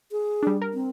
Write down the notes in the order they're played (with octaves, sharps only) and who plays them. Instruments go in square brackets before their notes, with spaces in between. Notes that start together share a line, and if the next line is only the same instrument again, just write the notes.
[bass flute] G#4
[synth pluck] G3 D4
A#4
[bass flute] C4